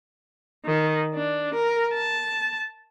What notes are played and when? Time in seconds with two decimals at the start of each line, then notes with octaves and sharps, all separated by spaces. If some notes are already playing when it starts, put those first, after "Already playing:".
0.65 D#3
1.14 D4
1.54 A#4
1.94 A5